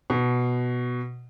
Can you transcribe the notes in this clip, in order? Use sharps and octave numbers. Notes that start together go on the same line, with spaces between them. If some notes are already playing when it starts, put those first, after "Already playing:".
B2